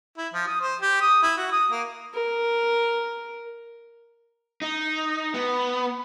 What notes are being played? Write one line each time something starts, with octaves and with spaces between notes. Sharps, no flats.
E4
F3
D#6
C5
G4
D#6
E4
F#4
D#6
A#3
A#4
D#4
B3